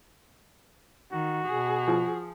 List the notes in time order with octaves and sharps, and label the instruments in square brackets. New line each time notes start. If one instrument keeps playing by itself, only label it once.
[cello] D#3 [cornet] F#4
[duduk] B2 [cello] G#4
[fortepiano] F3